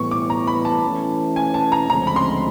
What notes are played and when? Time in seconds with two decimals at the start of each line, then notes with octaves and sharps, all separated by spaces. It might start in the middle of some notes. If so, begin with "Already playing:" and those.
Already playing: A2 E3 G3 B3 C#6
0.11 D6
0.30 A#5
0.47 B5
0.65 A5
0.83 E3 A3 C#4
1.36 G#5
1.54 A5
1.72 A#5
1.90 D2 C#3 F3 G#3 C4 A#5
2.07 B5
2.16 C6